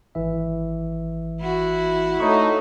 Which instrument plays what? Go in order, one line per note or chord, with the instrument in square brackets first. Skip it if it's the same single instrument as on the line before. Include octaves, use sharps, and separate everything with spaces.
[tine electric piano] G#1 E3 E5
[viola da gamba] E4 F#4
[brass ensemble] A3 D#4 [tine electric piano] A4 C#5 C#6